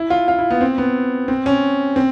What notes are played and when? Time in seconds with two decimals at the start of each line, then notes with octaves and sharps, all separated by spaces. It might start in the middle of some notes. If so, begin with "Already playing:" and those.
Already playing: E4
0.10 F4
0.28 F4
0.39 E4
0.50 B3
0.61 C4
0.78 B3
1.28 C4
1.46 C#4
1.96 C4